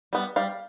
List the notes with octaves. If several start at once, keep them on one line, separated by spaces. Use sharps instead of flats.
G3 B3
G3 F5